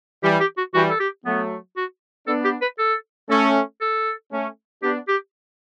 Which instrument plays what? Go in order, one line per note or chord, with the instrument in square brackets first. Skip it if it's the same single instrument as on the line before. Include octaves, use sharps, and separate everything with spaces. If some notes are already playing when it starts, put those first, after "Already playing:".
[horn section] E3 G3 [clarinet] G4
[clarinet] G4
F#4
[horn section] E3 G3 [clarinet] F#4
[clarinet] A4
G4
[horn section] F#3 A3 [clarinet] B3
[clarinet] F#4
[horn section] B3 D4 [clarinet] A4
[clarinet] G4
B4
A4
[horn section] A3 C#4 [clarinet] A4
[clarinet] A4
[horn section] A3 C#4
[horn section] B3 D4 [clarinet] G4
[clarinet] G4